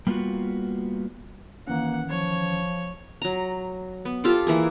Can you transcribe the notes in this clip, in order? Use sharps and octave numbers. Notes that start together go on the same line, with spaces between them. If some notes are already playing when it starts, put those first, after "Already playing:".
G3 A#3 B3 D#4 F4 F#4
D#3 E3 A#3 C#4 F#5
F3 C#5
F#3 A#5
B3
F4 G4 A4 C5
E3 A#3 G#4